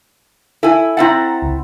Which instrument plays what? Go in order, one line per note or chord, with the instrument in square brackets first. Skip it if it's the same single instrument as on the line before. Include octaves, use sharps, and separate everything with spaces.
[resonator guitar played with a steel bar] E4 G#5 [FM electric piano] A4
[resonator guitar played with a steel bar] C4 E4 F#5 [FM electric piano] A#5 A6
[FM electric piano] C#2